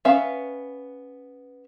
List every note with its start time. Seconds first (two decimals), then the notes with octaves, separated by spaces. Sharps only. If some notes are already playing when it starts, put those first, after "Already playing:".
0.05 B3 C#4 B4 E5 F5